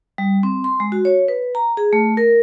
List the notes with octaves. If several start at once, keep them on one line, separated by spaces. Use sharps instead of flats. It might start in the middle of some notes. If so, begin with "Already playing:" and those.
G3
C4
C6
G#3
F#4
C#5
B4
A#5
G#4
A3
A#4